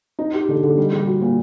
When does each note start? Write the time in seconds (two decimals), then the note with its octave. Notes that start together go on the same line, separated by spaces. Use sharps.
0.19 D#4
0.34 G4
0.49 D3
0.63 D3
0.78 G3
0.92 G3
1.07 F#4
1.21 A#2